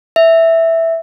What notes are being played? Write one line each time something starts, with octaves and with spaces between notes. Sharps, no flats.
E5